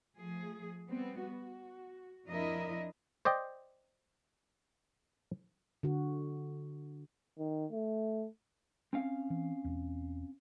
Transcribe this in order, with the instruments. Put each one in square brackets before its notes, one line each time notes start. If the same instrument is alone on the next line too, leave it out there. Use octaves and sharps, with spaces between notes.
[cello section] F3 A3 G#4
G3 B3 C4
F#4
F2 F3 D4 E4 A#4 D#5
[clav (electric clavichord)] C5 D5 D#5 G5
[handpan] D3 F#4
[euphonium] D#3
A3
[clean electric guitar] C4 C#4 F5
[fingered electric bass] E3
E1 E2